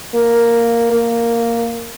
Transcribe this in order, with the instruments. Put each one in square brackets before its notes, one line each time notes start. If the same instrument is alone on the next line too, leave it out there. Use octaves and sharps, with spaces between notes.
[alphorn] A#3
A#3